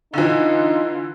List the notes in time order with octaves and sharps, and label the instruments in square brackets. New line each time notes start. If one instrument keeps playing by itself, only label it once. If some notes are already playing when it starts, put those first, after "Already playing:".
[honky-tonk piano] D3 E3 [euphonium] D#4 [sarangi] F4